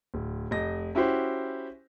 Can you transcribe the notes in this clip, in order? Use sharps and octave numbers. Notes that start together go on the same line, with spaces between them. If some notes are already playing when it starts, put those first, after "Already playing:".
D1
F1 D#5 A#6
C#4 E4 F#4 G4 C5